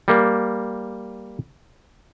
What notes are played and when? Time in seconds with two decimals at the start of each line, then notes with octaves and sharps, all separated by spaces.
0.08 G3 A#3